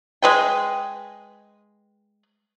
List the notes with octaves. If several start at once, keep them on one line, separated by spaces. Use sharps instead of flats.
G#3 B4 G5